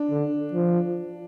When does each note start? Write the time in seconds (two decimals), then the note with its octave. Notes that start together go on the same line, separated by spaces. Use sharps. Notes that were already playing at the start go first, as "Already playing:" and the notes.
Already playing: D4
0.10 D3
0.54 F3